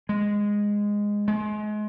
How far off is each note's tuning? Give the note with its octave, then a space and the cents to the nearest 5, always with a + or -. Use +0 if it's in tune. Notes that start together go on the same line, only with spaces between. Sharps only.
G#3 -10
G#3 +30